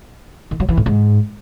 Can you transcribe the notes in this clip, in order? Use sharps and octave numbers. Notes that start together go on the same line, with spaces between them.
D#3
F#3
E3
A2
G#2